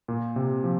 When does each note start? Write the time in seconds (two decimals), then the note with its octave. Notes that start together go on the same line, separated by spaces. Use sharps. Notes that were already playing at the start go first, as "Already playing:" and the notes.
0.08 A#2
0.36 C3
0.64 F3